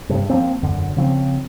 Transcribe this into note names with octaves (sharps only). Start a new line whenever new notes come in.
G2 C3
F3 A#3 C4
E1 F#2 D3
C#3 F3 C4